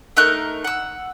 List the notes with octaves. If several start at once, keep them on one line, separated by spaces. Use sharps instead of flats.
A3 D#4 A#4 F#6
F#5 E6